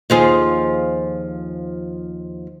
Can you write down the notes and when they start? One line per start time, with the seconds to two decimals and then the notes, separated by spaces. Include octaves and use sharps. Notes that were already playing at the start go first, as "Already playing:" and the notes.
0.10 D#2 F3 G#4